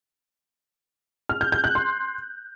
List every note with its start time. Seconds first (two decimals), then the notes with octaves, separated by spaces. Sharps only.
1.29 F6
1.41 G6
1.52 G6
1.64 F#6
1.75 C6